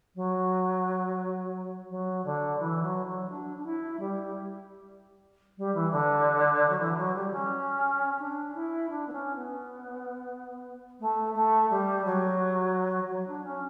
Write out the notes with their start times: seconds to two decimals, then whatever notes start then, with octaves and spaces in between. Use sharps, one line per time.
0.15 F#3
1.90 F#3
2.24 D3
2.59 E3
2.83 F#3
3.06 F#3
3.29 D4
3.56 D4
3.65 E4
3.99 G3
5.57 G3
5.74 E3
5.91 D3
6.69 F#3
6.79 E3
6.97 F#3
7.15 G3
7.32 C#4
8.19 D4
8.55 E4
8.89 D4
9.07 B3
9.12 C#4
9.36 B3
10.99 A3
11.34 A3
11.70 G3
12.05 F#3
13.09 F#3
13.27 D4
13.44 C#4